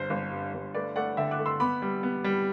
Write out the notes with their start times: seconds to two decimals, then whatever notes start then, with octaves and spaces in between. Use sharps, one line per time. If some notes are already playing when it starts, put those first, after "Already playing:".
Already playing: G1 C5
0.10 G1
0.31 G2
0.54 G1
0.75 A3 B4 D5
0.96 A3 D5 F#5
1.17 D3 E5 G5
1.31 D6 F#6
1.39 A3
1.46 C6 E6
1.60 B3 B5 D6
1.82 G3
2.03 B3
2.24 G3